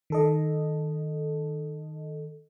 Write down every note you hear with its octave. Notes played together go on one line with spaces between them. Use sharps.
D#3 A4 D#5